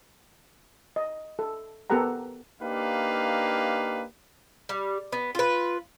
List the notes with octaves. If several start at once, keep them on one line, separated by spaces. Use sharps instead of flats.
D#5
A4
B3 G4 A4 A#4 F#5 A#5
A#3 D4 D#4 G4 B4 F5
G3
B3
F4 B4